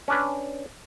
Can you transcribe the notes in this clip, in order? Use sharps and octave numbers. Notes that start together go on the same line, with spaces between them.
C#4 D4 B4